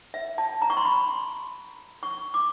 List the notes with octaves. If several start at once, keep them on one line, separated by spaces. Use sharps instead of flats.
E5
A5
A#5
C#6
C6
B5
C#6
D6